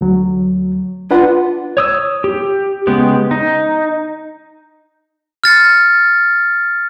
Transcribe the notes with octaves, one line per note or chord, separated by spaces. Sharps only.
D2 F#3
D4 F4 B4 F#5
C#5 D#6 E6
G4
C#3 G#3 B3 G4
D#4
F6 A6 C#7